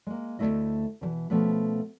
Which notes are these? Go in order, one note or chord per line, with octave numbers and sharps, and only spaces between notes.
G#3 A#3
D2 D#3 A3 E4 D#5
B2 D#3 E3
B2 F3 A3 B3 C#4 B4